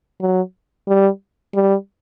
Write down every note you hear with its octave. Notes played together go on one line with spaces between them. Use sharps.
F#3
G3
G3